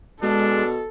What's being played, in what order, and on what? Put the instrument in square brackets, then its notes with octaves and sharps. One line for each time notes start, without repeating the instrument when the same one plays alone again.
[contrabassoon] B2 [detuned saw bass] G#3 [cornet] D4 [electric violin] A4